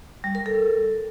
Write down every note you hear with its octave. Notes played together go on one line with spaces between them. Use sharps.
G3
A#4
A4